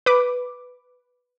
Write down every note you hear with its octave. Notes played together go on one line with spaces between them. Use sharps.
B4 D6